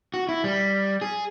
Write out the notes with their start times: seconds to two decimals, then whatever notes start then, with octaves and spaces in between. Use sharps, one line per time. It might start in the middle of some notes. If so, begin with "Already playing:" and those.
0.14 F#4
0.29 E4
0.44 G3
1.02 G#4